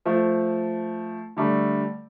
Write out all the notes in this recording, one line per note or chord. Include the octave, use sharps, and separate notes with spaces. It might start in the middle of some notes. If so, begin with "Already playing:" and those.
F3 A3
D3 G3 A3